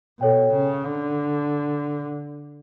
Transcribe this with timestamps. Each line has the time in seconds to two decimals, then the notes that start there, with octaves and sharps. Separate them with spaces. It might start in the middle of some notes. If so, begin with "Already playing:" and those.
0.20 B2 A4 C#5 G5
0.53 C#3
0.86 D3